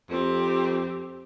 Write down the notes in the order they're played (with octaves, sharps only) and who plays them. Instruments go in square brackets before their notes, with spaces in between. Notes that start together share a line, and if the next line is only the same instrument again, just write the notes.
[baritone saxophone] F2 [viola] C4 G4